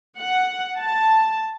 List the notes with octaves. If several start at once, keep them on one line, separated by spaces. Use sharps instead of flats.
F#5
A5